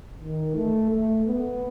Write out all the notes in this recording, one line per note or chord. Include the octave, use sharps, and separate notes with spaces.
D#3
A3
A3
B3